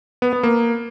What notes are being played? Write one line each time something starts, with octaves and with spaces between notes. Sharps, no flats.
B3
B3
A#3